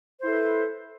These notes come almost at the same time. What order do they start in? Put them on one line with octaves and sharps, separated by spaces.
C5 E4 A4 B4